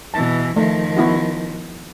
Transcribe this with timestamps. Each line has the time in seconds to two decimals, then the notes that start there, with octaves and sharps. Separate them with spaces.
0.14 B2 E3 A5
0.56 D#3 F3 A3
0.97 B3 E4 F#4